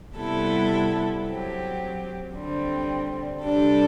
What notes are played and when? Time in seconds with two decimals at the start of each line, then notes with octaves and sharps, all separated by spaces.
0.15 C3 G3 B3 E4 A4
1.24 F#3 C4 G4
2.33 D3 G3 C4
3.42 C3 G3 D4 A4